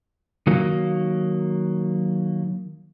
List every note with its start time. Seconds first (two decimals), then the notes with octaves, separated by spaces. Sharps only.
0.47 D#3 F#3 A#3